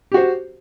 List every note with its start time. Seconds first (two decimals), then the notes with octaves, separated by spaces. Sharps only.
0.12 G4
0.14 F#4
0.17 C5